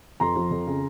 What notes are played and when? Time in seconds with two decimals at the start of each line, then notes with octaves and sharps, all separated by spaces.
0.20 F2 A#5 C6
0.36 F3
0.51 F2
0.67 C#3